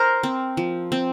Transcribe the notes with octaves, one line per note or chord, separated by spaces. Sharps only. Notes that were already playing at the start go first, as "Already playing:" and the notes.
Already playing: A#4 C5
C4
F3
C4